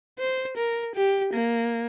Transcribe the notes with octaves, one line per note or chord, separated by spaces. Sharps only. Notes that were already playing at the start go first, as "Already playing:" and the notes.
C5
A#4
G4
A#3